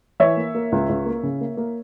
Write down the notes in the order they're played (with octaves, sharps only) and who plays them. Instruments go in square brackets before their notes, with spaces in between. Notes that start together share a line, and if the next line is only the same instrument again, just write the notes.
[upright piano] E3 C#5 E5
A#3
A#3
C#2
C#2
A#3
C#3
A#3
A#3